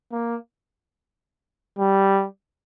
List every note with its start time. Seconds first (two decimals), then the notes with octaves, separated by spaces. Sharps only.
0.12 A#3
1.79 G3